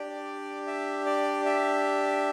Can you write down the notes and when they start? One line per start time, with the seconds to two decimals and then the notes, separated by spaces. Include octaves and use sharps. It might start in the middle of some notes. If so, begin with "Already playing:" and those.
Already playing: D4 G4 D5
0.67 E5
1.06 D5
1.45 E5